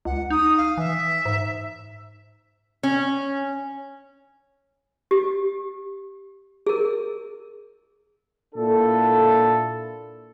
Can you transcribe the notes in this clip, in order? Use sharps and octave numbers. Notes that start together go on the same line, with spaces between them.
C#2 F#5
D#4 D#6
F5
E3 E5
G#2
C#4
G4
G#4 A#4
A#2 D4 E4 F4 A4